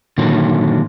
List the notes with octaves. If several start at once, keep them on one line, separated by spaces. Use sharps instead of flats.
A#2 D3 D#3 F#3